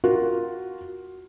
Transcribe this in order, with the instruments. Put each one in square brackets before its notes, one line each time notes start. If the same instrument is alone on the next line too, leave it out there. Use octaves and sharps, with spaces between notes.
[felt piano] F4 F#4 A#4